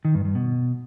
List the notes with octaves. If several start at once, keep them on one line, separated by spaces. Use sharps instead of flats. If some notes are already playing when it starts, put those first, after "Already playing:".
D#3
G2
G2
B2